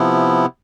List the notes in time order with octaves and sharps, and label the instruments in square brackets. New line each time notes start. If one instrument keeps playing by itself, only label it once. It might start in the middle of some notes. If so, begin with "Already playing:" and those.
Already playing: [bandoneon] C3 F3 B3 E4